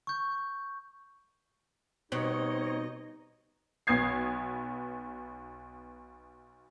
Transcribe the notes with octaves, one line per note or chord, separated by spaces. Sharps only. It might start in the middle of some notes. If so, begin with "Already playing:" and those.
C#6 G6
B2 G3 C4 D#4 C#5 D#5
B1 B3 D#6 G#6 C7